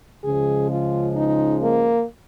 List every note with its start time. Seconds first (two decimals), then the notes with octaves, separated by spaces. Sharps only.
0.24 C#2 C#3 F3 G#3 G#4
0.70 F4
1.15 D#4
1.62 A#3